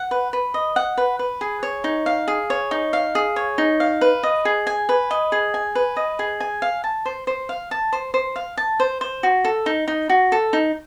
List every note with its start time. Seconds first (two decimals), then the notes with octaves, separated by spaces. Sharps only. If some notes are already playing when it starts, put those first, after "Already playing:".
Already playing: F#5
0.11 B4
0.33 B4
0.54 D#5
0.76 F#5
0.97 B4
1.19 B4
1.41 G#4
1.63 C#5
1.84 D#4
2.06 F5
2.28 G#4
2.50 C#5
2.71 D#4
2.93 F5
3.15 G#4
3.36 C#5
3.58 D#4
3.80 F5
4.01 B4
4.23 D#5
4.45 G#4
4.67 G#5
4.89 B4
5.11 D#5
5.32 G#4
5.54 G#5
5.75 B4
5.97 D#5
6.19 G#4
6.40 G#5
6.62 F5
6.84 A5
7.06 C5
7.27 C5
7.49 F5
7.71 A5
7.93 C5
8.14 C5
8.36 F5
8.57 A5
8.80 C5
9.01 C5
9.23 F#4
9.45 A4
9.66 D#4
9.88 D#4
10.09 F#4
10.32 A4
10.53 D#4